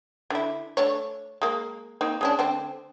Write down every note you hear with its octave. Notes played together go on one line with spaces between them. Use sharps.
D3 E4
A3 D4 C#5
G#3 A#3
A#3 C4 D#4
G#3 C#4 D4
D3 A3 C4